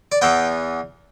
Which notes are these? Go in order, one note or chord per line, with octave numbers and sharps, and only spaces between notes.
D5
E2 E3 B3 G5